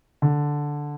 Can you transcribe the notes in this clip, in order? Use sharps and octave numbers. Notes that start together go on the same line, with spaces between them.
D3